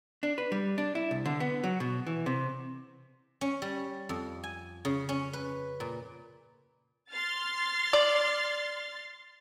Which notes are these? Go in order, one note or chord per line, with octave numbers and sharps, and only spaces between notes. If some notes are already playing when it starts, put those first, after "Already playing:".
D4
B4
G3
D4
E4
C2
D3
B3
F#3
B2
E3
C3
C#4
G3
F2
G#5
C#3
C#4
B4
A#2
C6 F6 A6
D5